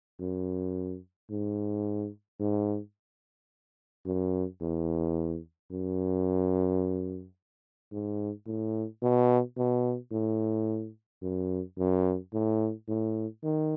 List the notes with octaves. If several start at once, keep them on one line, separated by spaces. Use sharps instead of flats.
F#2
G#2
G#2
F#2
E2
F#2
G#2
A2
B2
B2
A2
F#2
F#2
A2
A2
D#3